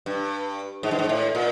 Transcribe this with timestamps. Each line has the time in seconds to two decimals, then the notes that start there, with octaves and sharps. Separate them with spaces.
0.06 G2
0.83 G#2
0.91 G2
0.99 G#2
1.09 A2
1.35 A#2